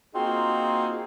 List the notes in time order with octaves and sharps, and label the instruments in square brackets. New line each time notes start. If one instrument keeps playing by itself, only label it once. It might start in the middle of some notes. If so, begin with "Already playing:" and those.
[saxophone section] A#3 C4 D#4 F4 F#4 G#4